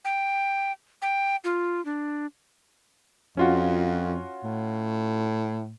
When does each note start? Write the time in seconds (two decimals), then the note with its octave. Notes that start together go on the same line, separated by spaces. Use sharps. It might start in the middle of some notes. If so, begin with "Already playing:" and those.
0.05 G5
1.02 G5
1.44 F4
1.85 D4
3.37 F2 C#4 F4 F#4
4.44 A2